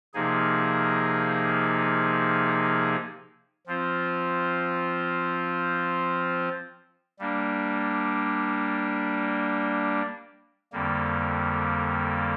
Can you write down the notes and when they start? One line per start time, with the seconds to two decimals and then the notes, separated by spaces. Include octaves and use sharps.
0.14 C3 F3 A#3 D#4 G#4
3.66 F3 C4 F4 C5
7.19 G3 A#3 D4
10.73 F2 D3 G3 A#3